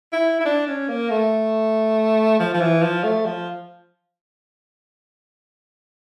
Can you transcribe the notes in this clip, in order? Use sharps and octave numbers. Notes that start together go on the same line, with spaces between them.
E4
E4
D4
C#4
A#3
A3
F3
F3
E3
F3
A3
F3